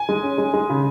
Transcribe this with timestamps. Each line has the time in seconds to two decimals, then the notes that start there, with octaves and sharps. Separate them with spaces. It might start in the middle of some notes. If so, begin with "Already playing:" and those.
Already playing: G#5
0.09 G#3
0.23 C#4
0.38 G#3
0.54 G#3
0.70 C#3